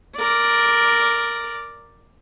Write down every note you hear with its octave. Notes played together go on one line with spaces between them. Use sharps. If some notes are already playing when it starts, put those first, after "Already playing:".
A#4 D5